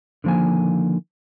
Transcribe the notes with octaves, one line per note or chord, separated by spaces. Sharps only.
D3 D#3 F3 A#3 G#5